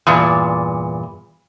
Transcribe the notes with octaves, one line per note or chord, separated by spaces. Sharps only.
E2 G2 A#2